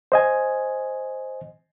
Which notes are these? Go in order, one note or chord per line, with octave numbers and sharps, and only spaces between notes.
C5 D#5 G#5